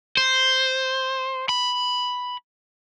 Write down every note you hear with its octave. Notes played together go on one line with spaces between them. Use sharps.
C5
B5